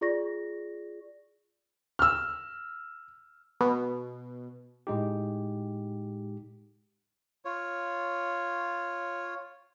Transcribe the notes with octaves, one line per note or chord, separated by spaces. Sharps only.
F4 G#4 D5 C#6 A#6
E6 F6
B2
A2 G#3 D#4 G4
F4 C#5